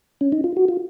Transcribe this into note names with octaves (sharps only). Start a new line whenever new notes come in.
C#4
D#4
F4
F#4
F4